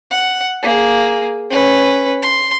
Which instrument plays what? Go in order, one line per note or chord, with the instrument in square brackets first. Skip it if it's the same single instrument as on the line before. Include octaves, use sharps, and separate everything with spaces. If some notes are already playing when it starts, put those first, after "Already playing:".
[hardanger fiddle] F#5
A#3 G#4
C#4 B4
C6